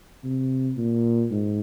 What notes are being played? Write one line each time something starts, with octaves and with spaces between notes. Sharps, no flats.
C3
A#2
G#2